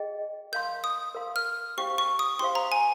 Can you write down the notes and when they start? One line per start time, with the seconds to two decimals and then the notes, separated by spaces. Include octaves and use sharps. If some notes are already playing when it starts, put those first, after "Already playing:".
Already playing: G#4 D#5 G5
0.52 A#4 F5 C6 G6
0.84 D#6
1.15 A#4 F5 C6
1.36 F6
1.78 C#4 G4 C5 F5 C#6
1.98 C#6
2.19 D#6
2.39 C#4 G4 C5 F5 C6
2.55 A#5
2.72 G#5